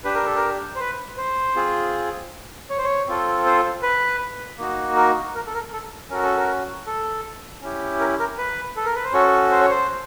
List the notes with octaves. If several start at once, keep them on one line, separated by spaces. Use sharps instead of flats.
D4 G4 B4
A#4
A4
A#4
C5
B4
C5
C4 F4 G#4
C#5
C5
C#5
C4 F4 A4
C5
B4
A#3 D#4 F#4
A#4
A#4
A4
A#4
A4
C#4 F#4 A4 A#4
A4
A#4
A4
C#4 E4 G4
A#4
A#4
B4
A4
A#4
B4
C5
C#4 F#4 A4 C#5
C5
C#5
C5